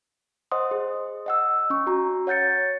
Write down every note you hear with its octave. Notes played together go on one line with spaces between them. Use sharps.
C5 D#5 F#5 C6 D#6
G#4
D#5 F#5 E6
C#4 C#6
F#4 A#5
C#5 F#5 G6 A6 C#7